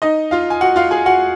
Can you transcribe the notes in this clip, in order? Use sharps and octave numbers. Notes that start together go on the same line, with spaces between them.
D#4 D#5
F4 F5
G#5
F#4 F#5
F4 F5
G#4 G#5
F#4 F#5